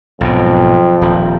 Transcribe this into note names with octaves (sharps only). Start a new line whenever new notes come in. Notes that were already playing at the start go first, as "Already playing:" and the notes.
B1 F2 G#2 B2
D#1 F3